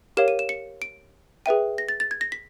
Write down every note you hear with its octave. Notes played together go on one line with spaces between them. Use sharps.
G4 A#4 C#5 F5 E7
D#7
E7
C#7
D7
G#4 B4 E5 G5 D#7
A#6
A6
A6
G#6
A#6
B6